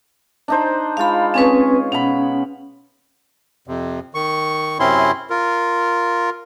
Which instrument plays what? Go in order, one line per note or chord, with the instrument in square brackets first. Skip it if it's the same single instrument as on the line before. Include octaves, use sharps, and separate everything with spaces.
[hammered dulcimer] D4 D#4 C5
[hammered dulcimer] G#3 F4 [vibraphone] F5 B5
[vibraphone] C4 C#4 B4 [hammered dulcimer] G#4 C#5 G#5
[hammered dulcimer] B2 B5 [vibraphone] C#4
[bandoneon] F2 C3
D#3 C#6
F#2 C3 C4 C#4 E4 C6
F4 A#4